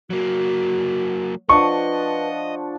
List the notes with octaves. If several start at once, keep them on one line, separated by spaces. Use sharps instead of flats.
F#3 A#3 F#4
F3 D4 B4 D#5 F#5 C#6